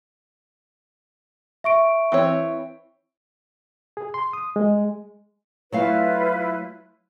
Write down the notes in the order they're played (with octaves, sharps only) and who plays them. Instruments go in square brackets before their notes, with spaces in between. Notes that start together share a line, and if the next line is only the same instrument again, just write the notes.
[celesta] E5 C#6 D7
[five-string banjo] E3 C4 C#5
[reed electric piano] G#4
C6
D#6
G#3
[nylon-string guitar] F#3 A3 F5 [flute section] E4 F4 B4